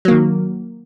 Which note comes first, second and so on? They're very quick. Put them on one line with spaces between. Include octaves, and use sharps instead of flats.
F#3 A#3 D#3